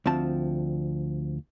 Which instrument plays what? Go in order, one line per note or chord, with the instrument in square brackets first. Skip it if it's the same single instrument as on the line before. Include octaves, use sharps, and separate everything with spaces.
[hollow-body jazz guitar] D2 F3 C4 A5